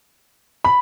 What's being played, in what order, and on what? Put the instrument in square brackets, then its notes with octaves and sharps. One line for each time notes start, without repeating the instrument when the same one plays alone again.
[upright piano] B5